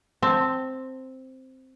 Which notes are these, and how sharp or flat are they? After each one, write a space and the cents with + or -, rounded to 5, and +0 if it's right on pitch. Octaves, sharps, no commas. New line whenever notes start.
C4 +0 A5 +10